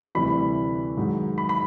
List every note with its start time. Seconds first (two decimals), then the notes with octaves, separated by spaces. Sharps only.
0.15 D2 C3 E3 G3 B5
0.97 G#2 D#3 F#3
1.38 B5
1.49 B5